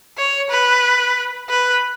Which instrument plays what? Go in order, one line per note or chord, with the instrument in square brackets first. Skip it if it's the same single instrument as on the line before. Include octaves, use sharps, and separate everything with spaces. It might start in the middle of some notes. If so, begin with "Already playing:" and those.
[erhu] C#5
B4
B4